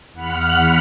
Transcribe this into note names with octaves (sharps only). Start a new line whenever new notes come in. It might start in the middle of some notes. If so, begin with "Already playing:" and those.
E2 F#5 B5 F6